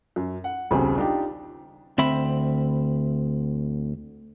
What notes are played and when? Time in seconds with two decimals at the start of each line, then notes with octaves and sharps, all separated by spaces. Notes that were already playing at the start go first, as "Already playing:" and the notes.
0.16 F#2
0.44 F#5
0.71 D#1 B1 C#3 C4
0.98 D4 D#4 F4 G4
1.98 D2 C4 E5 B5